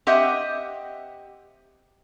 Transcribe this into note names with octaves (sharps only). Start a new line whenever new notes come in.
C4 G4 D#5 E5 F#5